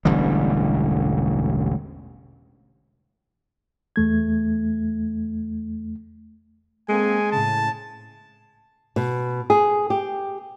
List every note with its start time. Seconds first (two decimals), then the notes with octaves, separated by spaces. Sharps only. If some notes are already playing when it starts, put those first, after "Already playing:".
0.05 E1 A1 D3 G3
3.96 E2 A3 G#6
6.89 G#3 A#3 C4 A4 G#5
7.32 A2 C#3 A5
8.96 B2
9.50 G#4
9.90 G4